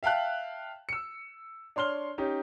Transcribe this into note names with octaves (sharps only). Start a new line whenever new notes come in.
E5 F5 G5 A5 F#6
E6 C#7
D4 C#5 C6 F6 G7
C#4 D#4 G4